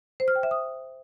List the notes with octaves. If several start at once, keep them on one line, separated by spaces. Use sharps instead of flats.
C5
F6
G5
E5
D#6